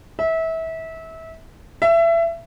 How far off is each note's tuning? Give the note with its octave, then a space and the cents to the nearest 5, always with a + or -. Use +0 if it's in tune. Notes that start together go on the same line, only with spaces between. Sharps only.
E5 -25
E5 +25